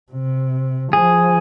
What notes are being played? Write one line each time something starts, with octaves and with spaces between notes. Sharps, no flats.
C3
F3 G#4